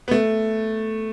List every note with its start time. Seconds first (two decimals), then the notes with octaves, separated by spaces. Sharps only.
0.08 B3
0.11 A3